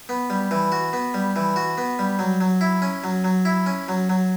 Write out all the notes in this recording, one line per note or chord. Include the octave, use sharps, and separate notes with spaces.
B3
G3
E3
F#4
B3
G3
E3
F#4
B3
G3
F#3
F#3
E4
C#4
F#3
F#3
E4
C#4
F#3
F#3